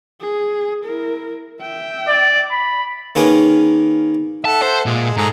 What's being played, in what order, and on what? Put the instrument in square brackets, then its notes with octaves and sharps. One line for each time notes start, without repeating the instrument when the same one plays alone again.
[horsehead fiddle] G#4
E4 A#4
E5 G5
[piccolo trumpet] D5
B5
[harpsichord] D#3 A#3 C#4 G#4 B4
[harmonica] A4 E5 F#5 [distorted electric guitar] A5
[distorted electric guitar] C5
[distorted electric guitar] A#2 [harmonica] G#3
[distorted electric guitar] G#2 [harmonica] G#4 A4 A#5